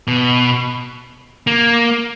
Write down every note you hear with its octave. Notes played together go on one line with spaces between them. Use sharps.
B2
A#3